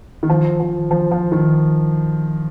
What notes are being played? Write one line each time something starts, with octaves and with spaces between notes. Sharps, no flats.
D#3
F3
F3
F3
F3
D#3